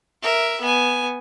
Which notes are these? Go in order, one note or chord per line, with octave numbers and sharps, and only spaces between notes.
A#4 E5
B3 G#5